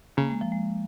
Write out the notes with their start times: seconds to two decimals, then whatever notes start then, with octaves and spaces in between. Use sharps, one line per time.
0.17 C#3 A#3
0.30 G#3
0.41 F3
0.52 G#3